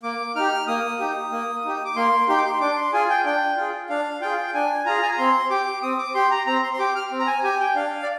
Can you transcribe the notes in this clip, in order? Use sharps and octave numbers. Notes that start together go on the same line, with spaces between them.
A#3 D6
D#4 G4 F6
A#3 D#6
D#4 G4
A#3
D#4 G4
D6
A#3 C6
D#4 G4 C6
D6
C6
D4 D6
C6
F4 G#4 G#5
G5
D4 G5
F4 G#4
D4 F5
F4 G#4 G5
D4 G#5
F4 G#4 A#5
G#5
A#5
C4 C6
G4 D6
C4 D#6
D6
G4 C6
A#5
C4 A#5
C6
C6
G4 D6
F6
C4
A#5
G#5
G4 G#5
G5
D4 F5
D5